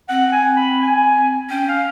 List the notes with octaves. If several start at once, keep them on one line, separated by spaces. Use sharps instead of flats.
C4 F#5
G#5
B5
G#5
C#4 G5
F5